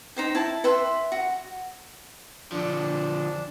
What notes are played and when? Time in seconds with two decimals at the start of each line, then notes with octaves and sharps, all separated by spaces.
0.16 D#4 C5 G5
0.35 E4 A5
0.64 B4 E5 G5 C6
1.12 F#4
2.52 D3 F3 D4